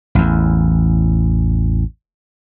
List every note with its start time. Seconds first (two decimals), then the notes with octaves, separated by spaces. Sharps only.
0.15 A1 E2